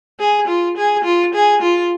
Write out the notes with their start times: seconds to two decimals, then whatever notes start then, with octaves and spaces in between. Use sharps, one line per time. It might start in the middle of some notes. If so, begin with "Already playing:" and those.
0.20 G#4
0.48 F4
0.77 G#4
1.04 F4
1.34 G#4
1.62 F4